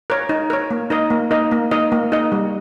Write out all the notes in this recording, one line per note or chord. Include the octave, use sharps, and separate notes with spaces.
A#4 C#5
D#4
A#4 C#5
A#3
D#4 A#4 D#5
A#3
D#4 A#4 D#5
A#3
D#4 A#4 D#5
A#3
D#4 A#4 D#5
G3